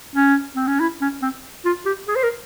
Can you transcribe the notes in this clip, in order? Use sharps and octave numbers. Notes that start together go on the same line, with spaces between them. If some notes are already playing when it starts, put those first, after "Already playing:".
C#4
C4
C#4
E4
C#4
C4
F4
G4
G#4
C5
A#4